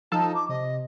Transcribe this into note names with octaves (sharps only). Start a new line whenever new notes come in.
F3 D#4 A4 F5 A5
D6
C3 D#5